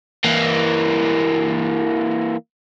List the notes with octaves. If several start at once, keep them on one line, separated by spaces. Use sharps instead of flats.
E3 A#3